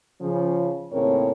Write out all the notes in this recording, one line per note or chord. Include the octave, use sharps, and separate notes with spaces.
C#3 F3 C#4
D#2 A2 C#3 C4 A#4 C#5